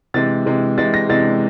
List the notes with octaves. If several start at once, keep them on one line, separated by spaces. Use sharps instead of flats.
C3 E3 G#3 A6
C3 E3 G#3
C3 E3 G#3 A6
A#6
C3 E3 G#3 A6